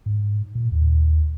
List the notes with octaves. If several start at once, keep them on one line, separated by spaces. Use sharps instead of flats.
G#2
A#2
D#2